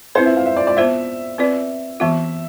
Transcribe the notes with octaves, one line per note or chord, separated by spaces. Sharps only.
C4 E4 B4 C5
E5
F5
E5
D5
D5
B3 F4 C5 E5
C4 F4 B4 D5
E3 B3 F4 E5